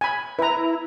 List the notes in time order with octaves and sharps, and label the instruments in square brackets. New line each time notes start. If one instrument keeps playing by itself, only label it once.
[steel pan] G#5 B5
[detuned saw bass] E4 [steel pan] B4 A#5